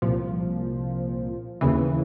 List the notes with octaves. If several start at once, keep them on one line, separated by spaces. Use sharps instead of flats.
C2 A#2 F3
D#2 C#3 E3